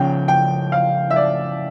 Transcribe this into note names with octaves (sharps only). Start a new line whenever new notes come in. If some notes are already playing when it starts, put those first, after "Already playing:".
Already playing: C#3 F3 C#4 G5
G5
F5
E5
D5